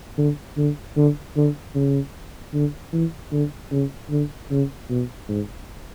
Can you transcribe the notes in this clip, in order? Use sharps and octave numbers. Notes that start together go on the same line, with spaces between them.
D3
D3
D3
D3
C#3
D3
E3
D3
C#3
D3
C#3
B2
G#2